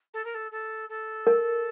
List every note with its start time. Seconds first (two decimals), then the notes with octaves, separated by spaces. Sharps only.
0.13 A4
0.24 A#4
0.34 A4
0.51 A4
0.89 A4
1.27 A#4